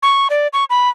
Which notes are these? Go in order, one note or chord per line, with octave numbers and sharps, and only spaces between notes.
C#6
D5
C#6
B5